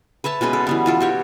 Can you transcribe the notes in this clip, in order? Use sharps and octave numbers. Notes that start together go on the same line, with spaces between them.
B4 C#5 E5 A5
B2 G#3 C#4 B4
A4
E3 G3 B3
E3 F4 A4
F#4 G4 C#5